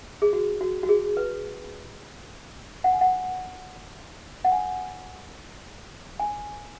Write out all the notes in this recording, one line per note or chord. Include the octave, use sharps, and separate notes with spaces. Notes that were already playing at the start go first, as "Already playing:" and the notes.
G#4
F#4
F#4
F#4
G#4
B4
F#5
G#5
F#5
F#5
G#5
G#5